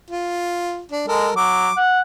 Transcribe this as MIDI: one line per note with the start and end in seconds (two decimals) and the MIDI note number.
0.11 0.81 65
0.92 1.03 62
1.08 1.28 56
1.08 1.32 69
1.08 1.32 70
1.36 1.69 54
1.36 1.76 86
1.77 2.00 78